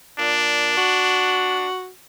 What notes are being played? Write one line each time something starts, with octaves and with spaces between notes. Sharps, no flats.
A#2 D4
F#4